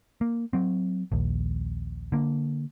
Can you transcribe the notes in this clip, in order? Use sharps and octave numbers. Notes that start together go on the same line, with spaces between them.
A#3
F#3 C4
A#1 D#2
D3 A#3